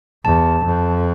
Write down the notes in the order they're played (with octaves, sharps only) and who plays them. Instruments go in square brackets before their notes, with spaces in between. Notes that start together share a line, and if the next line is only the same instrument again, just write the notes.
[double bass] E2 [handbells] A5
[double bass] F2